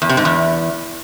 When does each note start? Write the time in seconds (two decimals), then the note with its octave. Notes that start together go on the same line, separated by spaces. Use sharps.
0.02 E2
0.09 C3
0.17 G#2
0.25 E2